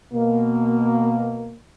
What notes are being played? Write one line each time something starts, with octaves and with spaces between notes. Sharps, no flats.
B2 A#3